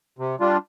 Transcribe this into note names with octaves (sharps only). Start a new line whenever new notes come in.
C3
G3 D4 F4